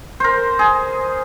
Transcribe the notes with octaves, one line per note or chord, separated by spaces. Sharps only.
A#4 C5
G#4